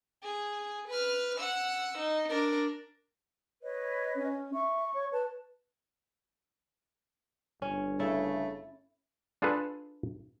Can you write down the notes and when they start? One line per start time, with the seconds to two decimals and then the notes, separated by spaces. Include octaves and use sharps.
0.23 G#4
0.88 B4 F6
1.39 F#5 E6
1.98 D#4
2.29 D4 A#4
3.63 B4 C#5 D#5
4.16 C#4
4.54 E5 C#6
4.94 C#5
5.12 B4 A5
7.62 G1 C#4
8.00 C#3 A3 E4
9.42 D4 F4 G#4 A4 B4